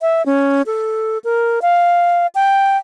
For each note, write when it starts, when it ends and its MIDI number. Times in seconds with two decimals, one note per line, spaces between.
0.01 0.25 76
0.26 0.62 61
0.66 1.18 69
1.24 1.59 70
1.62 2.27 77
2.35 2.77 79